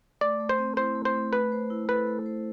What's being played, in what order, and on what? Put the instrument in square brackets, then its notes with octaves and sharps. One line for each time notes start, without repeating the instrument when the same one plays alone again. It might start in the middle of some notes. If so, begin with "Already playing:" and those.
[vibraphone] A3 [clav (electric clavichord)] D5
[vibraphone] A3
[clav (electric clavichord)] C5
[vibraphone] C4
[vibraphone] E4 [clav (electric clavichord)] C5
[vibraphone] A3
[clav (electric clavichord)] C5
[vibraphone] A3
[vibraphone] A3 [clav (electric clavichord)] B4
[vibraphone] C5
E4
[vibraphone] A4 [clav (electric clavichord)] B4
[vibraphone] A3
C5